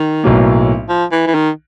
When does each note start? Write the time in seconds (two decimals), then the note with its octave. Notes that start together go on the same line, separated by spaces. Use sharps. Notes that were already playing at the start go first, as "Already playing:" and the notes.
Already playing: D#3
0.24 B1 A2 F#3 A#3
0.89 F3
1.12 E3
1.27 E3
1.34 D#3